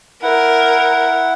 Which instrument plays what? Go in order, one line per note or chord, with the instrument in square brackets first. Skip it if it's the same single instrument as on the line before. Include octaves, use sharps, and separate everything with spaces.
[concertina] E4 F#5 [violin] A#4